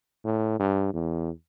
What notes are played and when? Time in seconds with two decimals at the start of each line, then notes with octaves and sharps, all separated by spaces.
0.24 A2
0.59 G2
0.94 E2